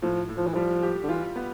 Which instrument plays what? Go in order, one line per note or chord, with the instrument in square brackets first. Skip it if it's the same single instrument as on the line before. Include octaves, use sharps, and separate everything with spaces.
[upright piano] A2 [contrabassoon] F3
[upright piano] A2
[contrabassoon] F3
E3
[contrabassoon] F3 [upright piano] G3
[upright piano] G4
[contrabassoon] D3
[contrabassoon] E3 [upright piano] F4
[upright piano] B3